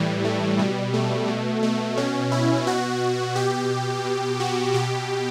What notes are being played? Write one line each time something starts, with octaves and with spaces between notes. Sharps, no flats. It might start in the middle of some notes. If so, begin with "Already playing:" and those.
Already playing: A2 E3 G3
A3
B2 G3
A3
B2
A3
B2 C#4
E4
B2 F#4
B2 G4
B2
F#4
B2 G4